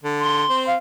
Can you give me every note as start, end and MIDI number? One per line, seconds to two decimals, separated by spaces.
0.03 0.44 50
0.20 0.65 84
0.50 0.75 60
0.67 0.74 77